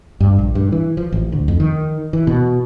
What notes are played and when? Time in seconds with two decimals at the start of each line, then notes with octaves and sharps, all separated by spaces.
0.20 G2
0.39 A#1
0.55 G2
0.72 E3
0.97 F3
1.12 A1
1.32 D2
1.48 F2
1.60 D#3
2.13 E3
2.27 B2